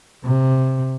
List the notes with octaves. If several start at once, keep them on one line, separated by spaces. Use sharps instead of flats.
C3